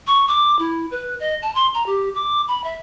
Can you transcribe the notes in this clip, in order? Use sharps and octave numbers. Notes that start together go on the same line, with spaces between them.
C#6
D6
E4
B4
D#5
A5
C6
A#5
G4
D6
B5
E5